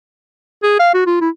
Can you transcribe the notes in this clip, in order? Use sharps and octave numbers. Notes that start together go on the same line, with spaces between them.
G#4
F5
F#4
F4
E4